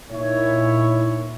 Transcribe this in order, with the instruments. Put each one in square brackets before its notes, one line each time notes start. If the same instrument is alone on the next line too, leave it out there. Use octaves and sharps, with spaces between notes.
[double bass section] A#2 [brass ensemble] D#4 E4 C#5